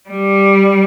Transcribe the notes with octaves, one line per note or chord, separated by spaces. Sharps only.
G3